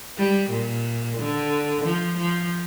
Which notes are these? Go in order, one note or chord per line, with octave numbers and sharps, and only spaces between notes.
G3
A#2
D3
F3
F3